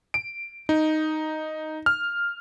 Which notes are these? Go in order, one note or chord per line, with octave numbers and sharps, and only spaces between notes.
D7
D#4
F6